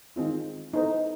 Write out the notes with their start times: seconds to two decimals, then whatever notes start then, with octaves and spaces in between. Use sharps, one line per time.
0.16 D#3 G#3 C4 F4
0.74 B3 D#4 E4 A4 C5 D#5